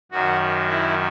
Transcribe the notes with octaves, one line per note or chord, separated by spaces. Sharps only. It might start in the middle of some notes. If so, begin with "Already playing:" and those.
F#2 D#3 F#3 F#4
E4